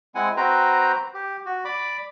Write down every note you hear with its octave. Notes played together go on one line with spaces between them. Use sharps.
G#3 C4 E4 F#5 G#5
C4 F#4 B4 C5 G5 A#5
G4
F#4
D5 B5 D6